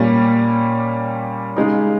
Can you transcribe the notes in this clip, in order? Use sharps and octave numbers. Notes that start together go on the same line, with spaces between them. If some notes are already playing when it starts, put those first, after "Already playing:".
Already playing: A#2 G3 A#3 C#4
C#3 G#3 D#4